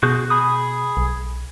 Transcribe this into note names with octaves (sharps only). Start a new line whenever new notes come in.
B2 F#4 G#4 G6
G#4 B5 D#6
B1